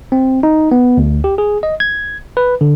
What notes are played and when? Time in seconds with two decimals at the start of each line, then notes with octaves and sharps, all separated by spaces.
0.12 C4
0.43 D#4
0.71 B3
0.97 D2
1.24 G4
1.38 G#4
1.63 D#5
1.80 G#6
2.37 B4
2.61 D3